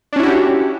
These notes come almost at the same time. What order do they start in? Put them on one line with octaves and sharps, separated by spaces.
D4 C#4 E4 F#4 G4